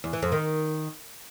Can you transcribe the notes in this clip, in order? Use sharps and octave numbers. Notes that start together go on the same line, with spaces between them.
E2
E3
F2
D#3